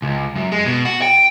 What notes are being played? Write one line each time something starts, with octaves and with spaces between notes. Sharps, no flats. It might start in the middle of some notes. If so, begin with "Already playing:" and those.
C#2
F#2
G#3
B2
F#4
G5